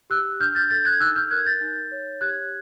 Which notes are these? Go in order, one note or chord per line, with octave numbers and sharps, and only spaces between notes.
G4 E6 F#6
D4 F6 G6
G6 A6
A4 G6 A6
F#6 G#6
D#4 E6 F#6
F6 G6
A#4 F#6 G#6
G6 A6
D#4
C#5
G4 F#6 G#6